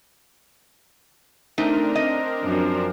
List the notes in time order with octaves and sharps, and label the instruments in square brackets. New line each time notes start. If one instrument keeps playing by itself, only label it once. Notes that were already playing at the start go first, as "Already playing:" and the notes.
[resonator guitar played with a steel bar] A3 D#4 [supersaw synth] C4 D4 A#4
[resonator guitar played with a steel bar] D#5
[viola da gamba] F#2 F3